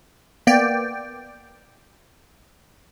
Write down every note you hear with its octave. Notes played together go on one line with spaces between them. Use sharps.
A#3 B3 D5 G5